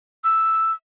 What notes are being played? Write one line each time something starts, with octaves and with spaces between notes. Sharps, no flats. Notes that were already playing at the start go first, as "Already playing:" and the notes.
E6